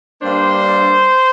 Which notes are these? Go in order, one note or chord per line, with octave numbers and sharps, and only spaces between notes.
G2 G3 A#3 D4 C5